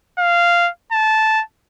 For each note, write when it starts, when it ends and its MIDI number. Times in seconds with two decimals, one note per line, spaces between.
0.19 0.69 77
0.92 1.42 81